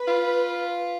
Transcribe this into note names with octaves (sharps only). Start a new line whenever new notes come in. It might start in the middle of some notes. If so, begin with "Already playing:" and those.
Already playing: B4
F4